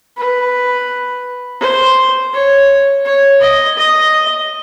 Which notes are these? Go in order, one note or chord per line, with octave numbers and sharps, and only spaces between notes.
B4
C5
C#5
C#5
D#5
D#5